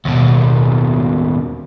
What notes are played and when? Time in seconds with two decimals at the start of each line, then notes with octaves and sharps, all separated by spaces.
0.05 D#2 B2